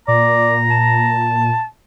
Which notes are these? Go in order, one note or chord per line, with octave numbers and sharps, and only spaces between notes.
A#2 D5 A#5
A5